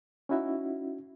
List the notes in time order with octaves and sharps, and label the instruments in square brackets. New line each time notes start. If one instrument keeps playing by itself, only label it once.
[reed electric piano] C#4 D#4 E4 F#4 E5